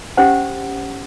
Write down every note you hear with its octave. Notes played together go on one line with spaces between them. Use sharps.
C#4 G4 C5 F#5